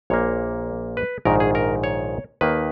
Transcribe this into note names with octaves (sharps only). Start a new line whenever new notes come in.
A#1 A#2 A#3 C#5
B4
A#1 G#2 D#3 A#4
G#4
A#4
C#5
D#2 D#3 A#3 B4